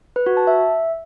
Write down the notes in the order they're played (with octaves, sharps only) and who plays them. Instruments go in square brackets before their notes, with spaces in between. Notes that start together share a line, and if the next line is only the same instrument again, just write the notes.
[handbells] B4
F#4
A5
E5